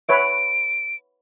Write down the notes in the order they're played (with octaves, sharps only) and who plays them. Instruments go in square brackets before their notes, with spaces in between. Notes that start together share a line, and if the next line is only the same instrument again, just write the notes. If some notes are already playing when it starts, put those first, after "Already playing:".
[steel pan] B4 C#5 E5 [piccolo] D7